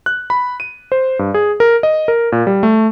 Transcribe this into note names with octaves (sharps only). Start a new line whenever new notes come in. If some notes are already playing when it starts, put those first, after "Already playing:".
F#6
B5
D#7
C5
G2
G#4
A#4
D#5
A#4
A#2
G3
A3